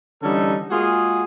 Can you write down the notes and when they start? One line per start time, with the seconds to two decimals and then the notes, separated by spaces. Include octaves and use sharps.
0.23 D3 E3 G3 C#4 D#4 A4
0.71 G#3 A#3 F4 F#4 G#4